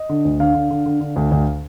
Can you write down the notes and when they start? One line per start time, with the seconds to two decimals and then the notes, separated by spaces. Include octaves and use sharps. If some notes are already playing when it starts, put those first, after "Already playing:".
Already playing: D#5
0.09 D3
0.25 D2
0.40 D3 F5
0.54 D3
0.70 D3
0.86 D3
1.01 D3
1.16 D2
1.31 D2